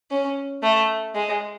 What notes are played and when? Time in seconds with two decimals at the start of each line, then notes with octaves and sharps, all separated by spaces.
0.11 C#4
0.63 A3
1.15 G#3